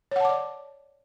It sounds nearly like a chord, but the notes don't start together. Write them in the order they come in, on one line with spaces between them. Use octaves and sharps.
C#5 F#5 A5 D6 D5